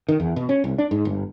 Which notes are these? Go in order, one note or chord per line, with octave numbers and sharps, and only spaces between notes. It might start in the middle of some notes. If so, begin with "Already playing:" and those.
D#3
E2
B2
C#4
C2
D4
G#2
G1